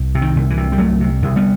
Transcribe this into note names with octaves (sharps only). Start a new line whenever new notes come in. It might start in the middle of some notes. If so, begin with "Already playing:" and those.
Already playing: C2
C3
D#3
C2
E3
C3
G3
C2 F#3 A3
C3
C2
G3 B3